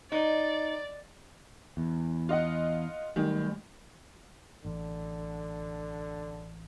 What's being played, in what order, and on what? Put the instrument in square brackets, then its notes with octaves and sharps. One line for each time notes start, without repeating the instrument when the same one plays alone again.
[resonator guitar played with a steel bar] D#4 [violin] D5
[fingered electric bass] E2
[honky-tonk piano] F4 D#5 F#5
[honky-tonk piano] D#3 [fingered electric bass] F#3 G3 A3
[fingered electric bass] A1 [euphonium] D3